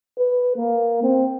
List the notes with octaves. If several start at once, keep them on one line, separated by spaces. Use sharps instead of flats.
B4
A#3
C4